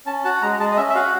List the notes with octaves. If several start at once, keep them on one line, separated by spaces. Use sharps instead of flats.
C#4 A5
F#4 A5
G#3 A#5
G#3 A5
D#5
C#4 E5
E5
F#4 F5